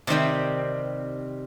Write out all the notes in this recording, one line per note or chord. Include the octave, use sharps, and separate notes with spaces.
C3 D#3 G3 C4